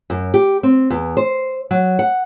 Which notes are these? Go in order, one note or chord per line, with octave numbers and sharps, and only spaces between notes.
F#2
G4
C4
E2
C5
F#3
F#5